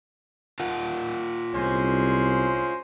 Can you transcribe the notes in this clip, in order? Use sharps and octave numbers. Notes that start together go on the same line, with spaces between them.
F4 A#4 F#5
C2 G#3 C#4 C5